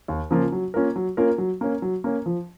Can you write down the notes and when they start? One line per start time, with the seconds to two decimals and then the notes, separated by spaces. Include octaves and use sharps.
0.08 D#2
0.31 C#3 F3 A#3 F4
0.52 F#3
0.74 A#3 C#4 F4 A#4
0.96 F#3
1.17 A#3 C#4 F4 A#4
1.38 F#3
1.61 A#3 C#4
1.82 F#3
2.04 A#3 C#4
2.26 F3